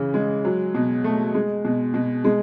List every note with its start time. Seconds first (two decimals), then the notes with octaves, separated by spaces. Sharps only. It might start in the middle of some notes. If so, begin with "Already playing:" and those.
Already playing: C#3 E3
0.14 G#3
0.45 F#3
0.74 B2
1.04 A3
1.34 G#3
1.65 B2
1.94 B2
2.24 G#3